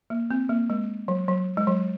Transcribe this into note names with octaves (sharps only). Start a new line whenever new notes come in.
A#3
C4
A#3
G#3
F#3
F#3
G#3
F#3